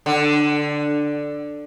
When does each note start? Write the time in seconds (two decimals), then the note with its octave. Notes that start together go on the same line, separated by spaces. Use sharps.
0.06 D3